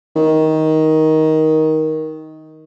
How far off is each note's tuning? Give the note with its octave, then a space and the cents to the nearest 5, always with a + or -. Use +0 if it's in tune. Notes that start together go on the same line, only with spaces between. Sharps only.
D#3 +15